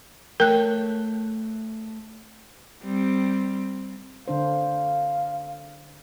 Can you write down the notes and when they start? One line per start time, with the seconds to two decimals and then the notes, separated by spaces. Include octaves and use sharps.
0.40 A3 A#4 C#5 G5 F#6
2.82 G3 C4
4.28 D3 D4 C5 F5